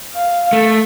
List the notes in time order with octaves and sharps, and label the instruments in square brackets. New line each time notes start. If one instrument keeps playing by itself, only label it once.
[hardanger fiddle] F5
[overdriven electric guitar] A3